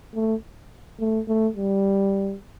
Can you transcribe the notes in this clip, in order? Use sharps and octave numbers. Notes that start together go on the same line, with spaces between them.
A3
A3
A3
G3